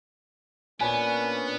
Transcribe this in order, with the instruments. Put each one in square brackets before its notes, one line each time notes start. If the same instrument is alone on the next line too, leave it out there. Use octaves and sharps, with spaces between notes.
[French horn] A#2 [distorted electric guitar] B3 [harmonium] C#4 D4 B4 [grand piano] G#5